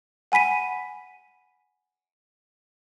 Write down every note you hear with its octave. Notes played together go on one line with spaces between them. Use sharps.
F#5 G#5 B5 B6 D#7